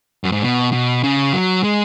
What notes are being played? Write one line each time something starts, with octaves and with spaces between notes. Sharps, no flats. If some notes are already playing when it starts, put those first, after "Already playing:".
F#2
G#2
B2
B2
C#3
F#3
G#3